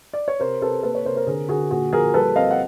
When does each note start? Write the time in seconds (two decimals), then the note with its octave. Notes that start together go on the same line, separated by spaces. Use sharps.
0.13 D5
0.28 C#5
0.40 C3 A#4 C5
0.61 C3 A4 B4
0.83 A#3 A4 B4
0.95 B4 C#5
1.05 C3 A#4 C5
1.16 A#4 C5
1.27 D3 G#4 A#4
1.49 D3 F#4 G#4
1.71 A#2 F#4 G#4
1.93 F3 G#4 A#4
2.14 G3 A4 B4
2.36 C4 D#5 F5
2.51 F#5